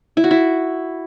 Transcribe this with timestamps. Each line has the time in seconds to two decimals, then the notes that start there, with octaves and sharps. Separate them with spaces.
0.17 E4
0.24 F#4
0.31 E4